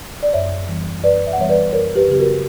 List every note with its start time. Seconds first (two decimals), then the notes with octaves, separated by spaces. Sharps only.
0.23 D5
0.33 F#2 C#5 E5
0.68 E3 G3 B3
1.03 F#2 B4 D5
1.27 E5
1.33 F#5
1.37 E3 G3 B3 C#5 E5
1.49 B4 D5
1.72 F#2 A#4 C#5
1.96 G4 B4
2.08 C#3 F#3 B3 G4
2.19 F#4 A#4